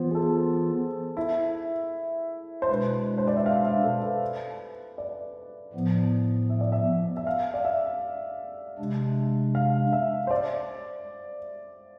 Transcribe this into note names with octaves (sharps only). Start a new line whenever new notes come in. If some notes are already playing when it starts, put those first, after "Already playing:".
Already playing: E3 B3 F4 C5
G#4
A4
E4
C5
B2 G#3 D4 B4
C5
D5
E5
F5
E5
A4
B4
D5
A2 F3 B3
E5
D5
E5
E5
F5
D5
E5
C3 G#3 D4
F5
E5
C5
D5